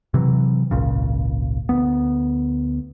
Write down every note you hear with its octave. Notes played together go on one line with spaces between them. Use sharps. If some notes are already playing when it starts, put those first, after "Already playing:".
C3 E3 F#3
G#1 C#2 A#2 C#3
D2 B3